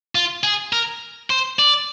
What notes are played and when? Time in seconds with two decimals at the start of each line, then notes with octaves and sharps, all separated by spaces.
0.15 F4
0.44 G#4
0.73 A#4
1.30 C5
1.59 D5